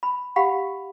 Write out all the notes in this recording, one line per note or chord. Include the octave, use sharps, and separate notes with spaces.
B5
G4 F5 F#5 B5